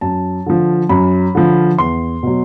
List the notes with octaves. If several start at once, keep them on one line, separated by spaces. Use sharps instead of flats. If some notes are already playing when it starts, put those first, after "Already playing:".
F#2 A5
D3 F3
F#2 B5
D3 F3
E2 C6
B2 F#3